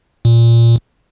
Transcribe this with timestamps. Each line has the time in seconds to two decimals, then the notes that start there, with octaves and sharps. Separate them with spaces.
0.25 A#2